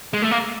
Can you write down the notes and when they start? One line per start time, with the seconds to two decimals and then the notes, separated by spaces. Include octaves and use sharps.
0.13 G#3
0.22 A3
0.31 A#3